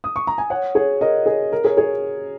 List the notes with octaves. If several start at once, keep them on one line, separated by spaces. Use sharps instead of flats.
D#6
C#6
A#5
G#5
C#5 F#5
G#4 C#5
A#4 D#5
G#4 C#5
A#4
G#4 C#5
G#4 C#5